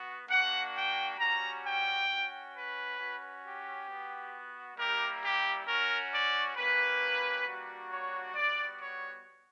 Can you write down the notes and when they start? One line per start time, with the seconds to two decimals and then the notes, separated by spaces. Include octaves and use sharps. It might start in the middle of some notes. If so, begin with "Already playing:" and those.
Already playing: B3 F#4
0.28 A#3 D4 F#4 F#5
0.73 G5
1.17 G3 C#4 F#4 A#5
1.63 G5
2.07 C#4 F#4
2.53 B4
2.97 C#4 F#4
3.42 G4
3.87 B3 F#4
4.76 G3 A#3 E4 G4 A#4
5.21 G4
5.65 C#4 F#4 A#4
6.10 D5
6.55 A#3 C#4 G4 B4
7.45 G3 A#3 D4 F#4
7.90 C#5
8.34 G3 B3 F#4 D5
8.79 C#5